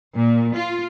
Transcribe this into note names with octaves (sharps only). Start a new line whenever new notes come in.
A#2
F4